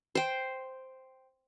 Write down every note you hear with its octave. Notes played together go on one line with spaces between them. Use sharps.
C5 G5